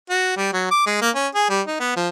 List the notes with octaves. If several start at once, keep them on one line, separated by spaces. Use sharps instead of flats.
F#4
G3
F#3
D6
G#3
A#3
C#4
G#4
G3
D#4
B3
F3